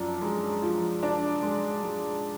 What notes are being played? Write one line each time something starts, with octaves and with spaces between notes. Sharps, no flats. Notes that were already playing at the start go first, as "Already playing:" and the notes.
Already playing: F#2 F3 D4
G#3
F3
D4
G#3
G#3